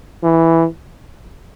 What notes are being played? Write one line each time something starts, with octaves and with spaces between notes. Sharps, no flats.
E3